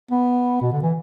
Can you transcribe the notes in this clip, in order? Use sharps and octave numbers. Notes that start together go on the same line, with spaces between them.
B3
B2
D3
E3